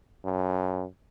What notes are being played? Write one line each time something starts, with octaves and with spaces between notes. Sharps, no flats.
F#2